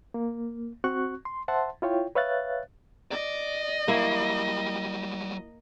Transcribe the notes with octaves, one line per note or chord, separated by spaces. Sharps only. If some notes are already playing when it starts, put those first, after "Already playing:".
A#3
C4 F#4 C#6 F#6
C6
C5 E5 F#5 A5 C6
E4 F4 C#5 G5
B4 C#5 E5 F5 F#6 A6
D5 D#5
F#3 G3 A#3 E4